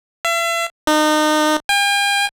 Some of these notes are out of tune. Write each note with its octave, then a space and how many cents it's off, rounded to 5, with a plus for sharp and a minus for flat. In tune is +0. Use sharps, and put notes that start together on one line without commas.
E5 +40
D#4 -30
G5 +45